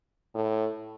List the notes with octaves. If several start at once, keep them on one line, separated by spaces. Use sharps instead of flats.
A2